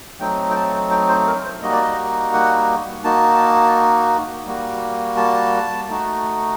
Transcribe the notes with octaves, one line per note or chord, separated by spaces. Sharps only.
F#3 A3 C4 D#4 G5
G5
A5
G5
C5
A#4
C5
G3 A#3 D#4 F#4 D#5
D5
D#5
F#5
A#3 D#4 F#4 A5
G3 A#3 F#4
A5
A3 D#4 F#4